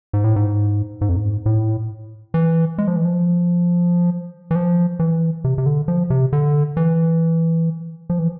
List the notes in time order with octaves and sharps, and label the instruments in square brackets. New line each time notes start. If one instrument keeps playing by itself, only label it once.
[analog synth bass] G#2
A2
G#2
G#2
F2
G#2
A2
E3
G#3
F3
E3
F3
E3
F3
E3
C3
C3
D3
F3
C3
D3
E3
F3
E3